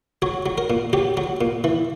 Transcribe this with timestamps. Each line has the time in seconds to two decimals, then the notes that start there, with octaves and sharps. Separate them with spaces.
0.22 F#3 C#5
0.46 F#3
0.58 A#4
0.70 A#2
0.93 F#3 G4
1.17 F#3
1.41 A#2
1.64 E3